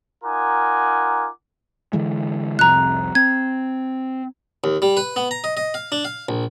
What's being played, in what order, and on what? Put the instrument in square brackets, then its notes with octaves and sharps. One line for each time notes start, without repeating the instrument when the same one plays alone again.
[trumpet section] D#4 F4 A#4 F#5 G#5 D6
[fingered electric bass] D3 E3 G#3
[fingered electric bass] C2 F2 C3 [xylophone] A#5 F#6
[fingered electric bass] C4 [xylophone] G#6
[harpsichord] D#2
G3
B4
B3
A#5
D#5
D#5
F5
D4
F5
A#1